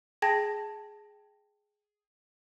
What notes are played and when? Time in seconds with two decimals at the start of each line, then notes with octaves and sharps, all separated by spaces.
0.22 G#4 G5 A5 G#6 A#6